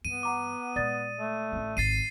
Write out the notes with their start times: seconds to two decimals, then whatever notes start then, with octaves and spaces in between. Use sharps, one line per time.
0.05 G2 E3 B3 D#7
0.23 F#5 A#5 D6
0.76 A#2 G#3 D5 D#6 A6
1.19 A3
1.52 A1 C#4
1.77 G#1 F2 A6 C7 D#7